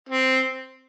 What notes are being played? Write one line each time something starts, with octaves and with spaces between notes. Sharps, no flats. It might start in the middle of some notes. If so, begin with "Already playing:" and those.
C4